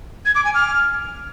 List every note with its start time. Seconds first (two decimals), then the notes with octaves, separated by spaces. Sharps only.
0.26 G#6
0.35 D6
0.45 G#5
0.54 F6